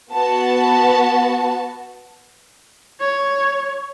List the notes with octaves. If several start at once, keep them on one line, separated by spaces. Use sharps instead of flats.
B3 F#4 A5
C#5